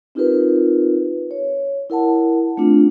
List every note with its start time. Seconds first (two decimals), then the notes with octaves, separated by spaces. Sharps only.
0.15 C4 D#4 F4 G4 A#4 B4
1.31 C#5
1.90 E4 A#4 F#5 A5
2.57 A3 C4 D4 F4